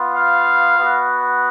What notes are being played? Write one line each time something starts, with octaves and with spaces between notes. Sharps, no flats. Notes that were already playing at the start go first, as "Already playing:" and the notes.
Already playing: B3 F4
F5
B3 F#4